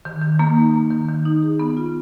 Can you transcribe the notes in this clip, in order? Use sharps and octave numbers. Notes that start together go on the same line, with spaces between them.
D#3
D#3
A#3
D#4
A#3
D#3
D#3
D#4
G#4
B3
F4